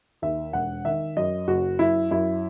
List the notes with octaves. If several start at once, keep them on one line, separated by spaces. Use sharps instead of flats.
D#2 E5
E1 F#5
D#3 E5
F#2 D#5
F#1 F#4
F#2 E4
F#2 E4